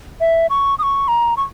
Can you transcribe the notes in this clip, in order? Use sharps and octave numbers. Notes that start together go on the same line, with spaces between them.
E5
C#6
D#6
C#6
A#5
C#6